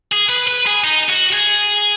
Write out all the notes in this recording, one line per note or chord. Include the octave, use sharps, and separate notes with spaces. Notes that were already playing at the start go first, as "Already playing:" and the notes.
G#4
B4
B4
G#4
D#4
F#4
G#4